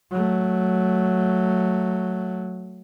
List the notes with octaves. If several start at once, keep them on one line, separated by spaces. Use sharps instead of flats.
F#3 A3